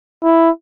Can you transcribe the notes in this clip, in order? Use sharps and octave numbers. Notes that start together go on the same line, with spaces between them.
E4